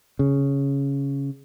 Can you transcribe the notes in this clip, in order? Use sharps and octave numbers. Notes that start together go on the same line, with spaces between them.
C#3